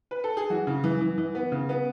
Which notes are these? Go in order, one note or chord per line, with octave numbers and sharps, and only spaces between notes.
B4
A4
G#4
E3 F#4
C#3
E3
E3
E3
B3
C#3
B3